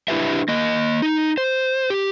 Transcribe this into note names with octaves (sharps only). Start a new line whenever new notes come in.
D4 E4 F4 G4 B4 E5
A#3 D#5
D#4
C5
G4